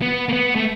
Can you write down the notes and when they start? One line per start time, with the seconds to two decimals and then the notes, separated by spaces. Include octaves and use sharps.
0.02 B3
0.29 A#3
0.33 B3
0.56 A3